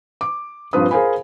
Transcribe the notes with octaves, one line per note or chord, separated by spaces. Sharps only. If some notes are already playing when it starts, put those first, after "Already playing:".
D6
A#1 G2 C4 F4 B4 D#6
G#4 A#4 C5 F5 G#5 B5